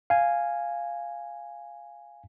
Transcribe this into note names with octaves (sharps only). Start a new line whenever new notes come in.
F5 G#5